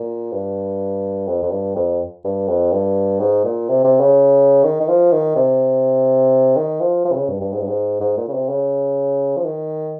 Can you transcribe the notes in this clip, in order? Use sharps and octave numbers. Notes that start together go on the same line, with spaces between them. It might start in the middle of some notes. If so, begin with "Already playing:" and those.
Already playing: A#2
G2
F2
F2
G2
F2
G2
F2
G2
G#2
A#2
C3
C3
C#3
D#3
D#3
F3
D#3
C3
D#3
F3
F3
C3
C#3
G2
G2
G#2
G2
G#2
G#2
A#2
C#3
C3
C#3
F3
D#3